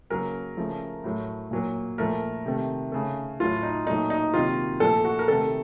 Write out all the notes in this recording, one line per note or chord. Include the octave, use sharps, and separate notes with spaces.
C#3 F#3 A#3 A#4
C#3 F3 A3
A2 F#3 A3
A#2 F#3 A#3
A#2 F3 A3 A#4
C3 D#3 A3
C#3 A3
A2 F#3 A3 F4
D#4
A#2 F#3 A3 D#4
D#4
C3 D#3 F#3 A#3 F4
A#2 F3 A3 A4
F#4
A#4
C3 D#3 A3 A4